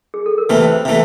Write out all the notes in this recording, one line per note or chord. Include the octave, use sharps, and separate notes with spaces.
G#4
A4
A#4
C3 E3 A3 B4
C5
C3 E3 A3